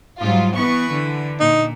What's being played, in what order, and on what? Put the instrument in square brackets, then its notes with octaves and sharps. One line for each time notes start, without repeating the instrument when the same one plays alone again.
[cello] G#2 G3 [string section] F#3 F4
[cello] E3 B4 [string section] B3 C#6
[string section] D3
[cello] A#2 A#3 [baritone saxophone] D#4